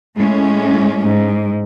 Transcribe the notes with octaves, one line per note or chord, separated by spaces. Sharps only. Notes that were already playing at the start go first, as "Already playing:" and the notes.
A2 G#3 C#4
G#2